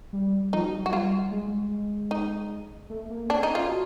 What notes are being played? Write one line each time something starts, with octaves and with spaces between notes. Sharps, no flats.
G3
F3 D#4
F#3
G3
F#3
F#4
G3 F4
G#3
D#4
A3
A#3
C4 D4
C#4 D#4
F4
F#4